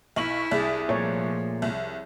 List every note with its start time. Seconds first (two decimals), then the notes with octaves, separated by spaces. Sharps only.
0.16 B1 E4 C#6 F#7
0.51 C2 G#4 D5
0.89 A#2 F3 A3 C#5 D5
1.62 C2